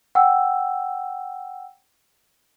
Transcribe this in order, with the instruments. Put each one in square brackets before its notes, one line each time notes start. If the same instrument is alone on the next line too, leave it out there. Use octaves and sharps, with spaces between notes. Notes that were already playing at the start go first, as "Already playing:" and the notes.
[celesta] F#5 G5 E6